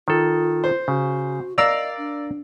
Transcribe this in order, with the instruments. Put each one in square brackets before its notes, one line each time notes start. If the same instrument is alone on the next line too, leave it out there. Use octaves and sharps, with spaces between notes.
[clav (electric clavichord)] D#3 A4 [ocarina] F4
[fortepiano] C5
[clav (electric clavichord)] C#3 [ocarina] F#4
[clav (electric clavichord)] A#4 F5 A#5 [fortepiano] D5 E6 [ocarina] D#5
[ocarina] D4